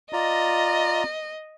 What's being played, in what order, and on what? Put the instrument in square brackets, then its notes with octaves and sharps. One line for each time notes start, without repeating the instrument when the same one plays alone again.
[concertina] F4 D5 A#5 [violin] D#5